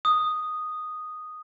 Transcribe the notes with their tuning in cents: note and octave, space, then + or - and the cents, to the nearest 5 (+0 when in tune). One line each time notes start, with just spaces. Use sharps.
D#6 -5